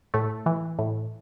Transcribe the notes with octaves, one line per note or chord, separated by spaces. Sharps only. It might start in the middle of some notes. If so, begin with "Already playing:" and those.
A2 A3
E3
A2